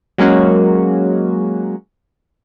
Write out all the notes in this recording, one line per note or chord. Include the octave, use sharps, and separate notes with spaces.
F#3 G#3 A#3 C#4 F#4